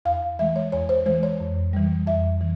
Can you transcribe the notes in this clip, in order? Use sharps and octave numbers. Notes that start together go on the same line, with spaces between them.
E2 F5
E3 G#3 E5
C#5
E2 C#5
C5
E3 G#3 C5
C#5
F2
E3 G3
F2 E5
E3